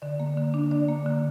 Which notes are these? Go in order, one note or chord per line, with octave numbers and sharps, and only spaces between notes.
D3 D5
A#3
D3
D4
D3 D5
A#3
D3